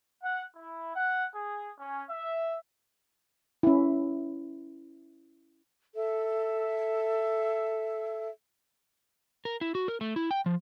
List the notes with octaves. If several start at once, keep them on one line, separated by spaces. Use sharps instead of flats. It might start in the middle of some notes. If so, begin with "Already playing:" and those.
F#5
E4
F#5
G#4
C#4
E5
C#4 E4
A4 E5
A#4
E4
F#4
A#4
A3
E4
G5
F3